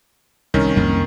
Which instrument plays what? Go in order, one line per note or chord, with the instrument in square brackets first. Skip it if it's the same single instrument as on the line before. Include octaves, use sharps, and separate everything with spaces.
[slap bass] C2 [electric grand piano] D#3 C#4
[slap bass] C2 F2 A#3